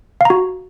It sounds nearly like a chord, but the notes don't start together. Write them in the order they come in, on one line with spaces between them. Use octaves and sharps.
F5 A#5 F#4